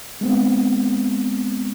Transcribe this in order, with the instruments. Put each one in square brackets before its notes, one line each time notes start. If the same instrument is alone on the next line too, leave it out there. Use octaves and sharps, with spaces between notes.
[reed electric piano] G#3 B3 C4